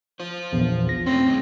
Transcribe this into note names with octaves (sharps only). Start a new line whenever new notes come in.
F4 C5
A#1 E2
A#6
B2 A3 C4 C#4
A2 C#3 G#3